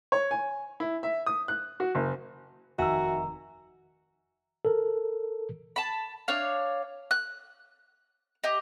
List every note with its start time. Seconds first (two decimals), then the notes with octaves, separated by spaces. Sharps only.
0.12 C#5
0.31 G#5
0.80 E4
1.03 E5
1.26 D#6
1.48 F#6
1.80 F#4
1.95 F#1
2.79 F1 D#3 F#4 E5 G#5 A#5 E6
4.65 A4 A#4
5.76 A5 B5
6.28 D4 C#5 F5
7.11 F#6
8.44 G4 D#5